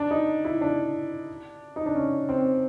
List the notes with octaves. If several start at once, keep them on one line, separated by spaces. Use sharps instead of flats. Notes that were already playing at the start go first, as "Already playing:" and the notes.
Already playing: D4
D#4
E4
D4
D#4
D4
C#4
C4